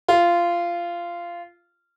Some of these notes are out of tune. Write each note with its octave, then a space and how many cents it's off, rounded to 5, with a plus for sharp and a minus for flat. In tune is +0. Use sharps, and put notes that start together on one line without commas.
F4 -15